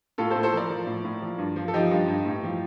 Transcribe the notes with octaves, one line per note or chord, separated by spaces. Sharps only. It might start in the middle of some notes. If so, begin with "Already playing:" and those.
A2 F4 A4
A4 C5
A2
A4 C5
F3 A#4 D5
F3
A2
A2
F3
G2
F3
A4
F3 D#4 G4
G2
G2
A2
F3